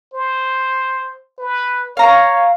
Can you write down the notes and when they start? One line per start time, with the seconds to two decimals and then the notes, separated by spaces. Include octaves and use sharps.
0.14 C5
1.39 B4
1.97 C#5 F5 A#5